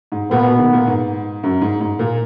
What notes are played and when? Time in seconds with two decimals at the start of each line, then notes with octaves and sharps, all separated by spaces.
0.12 G#2
0.31 A#2 B3
0.45 B2
0.58 D#3
0.73 A#2
0.87 G#2
1.43 F#2
1.61 G#2
1.80 G#2
1.99 A#2